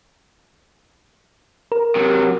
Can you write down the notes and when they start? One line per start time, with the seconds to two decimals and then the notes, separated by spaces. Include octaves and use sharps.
1.72 A#4
1.95 C3 F#3